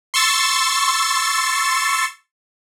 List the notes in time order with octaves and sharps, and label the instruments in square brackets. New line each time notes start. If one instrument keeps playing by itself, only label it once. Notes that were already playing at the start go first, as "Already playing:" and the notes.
[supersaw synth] C6 C#6 E6 A6